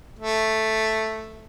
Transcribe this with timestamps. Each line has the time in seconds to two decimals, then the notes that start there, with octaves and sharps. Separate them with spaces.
0.19 A3